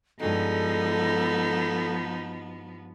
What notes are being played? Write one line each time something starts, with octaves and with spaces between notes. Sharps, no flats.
G2 F3 G#3 B3 D#4 F#4 A4